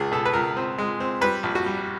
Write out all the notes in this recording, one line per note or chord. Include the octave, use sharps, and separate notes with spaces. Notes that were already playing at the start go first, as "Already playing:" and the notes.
Already playing: C#2 G#4
B2 A4
B4
C#2 A#4
C4
G#3
C4
G3 B4
A#1
F#4
G3